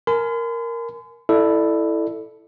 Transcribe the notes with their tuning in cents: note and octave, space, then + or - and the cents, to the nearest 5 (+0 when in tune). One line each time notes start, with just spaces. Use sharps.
A#4 +0 G#5 +25 C6 -45
E4 +0 A4 +0 D5 +30